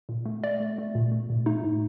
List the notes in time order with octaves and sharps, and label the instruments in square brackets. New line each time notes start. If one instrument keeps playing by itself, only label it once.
[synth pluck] A#2
A3
A3 D5
A3
A3
A#2
A3
A#2
A3 D#4
A2